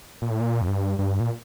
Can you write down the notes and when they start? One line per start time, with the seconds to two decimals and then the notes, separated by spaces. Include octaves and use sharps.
0.22 A#2
0.31 A2
0.40 A#2
0.62 F2
0.68 G2
0.99 G2
1.20 A#2